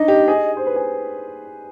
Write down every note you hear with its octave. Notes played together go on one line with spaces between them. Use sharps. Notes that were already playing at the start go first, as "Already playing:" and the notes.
Already playing: D4 D#4 D#5
G4
G#4
C5
B4
G#4